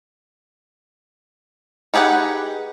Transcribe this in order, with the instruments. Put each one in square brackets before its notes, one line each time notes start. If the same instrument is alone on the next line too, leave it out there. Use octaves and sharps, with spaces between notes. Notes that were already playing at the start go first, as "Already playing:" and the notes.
[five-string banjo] D#4 G4 G#4 B4 F#5